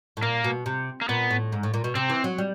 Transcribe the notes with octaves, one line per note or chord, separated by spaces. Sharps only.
A2
A#2 A#3
B2
C3
A#3
A#2 B3
A2
G#2
A2
A#2
B2
C3 C4
E3
F#3
G3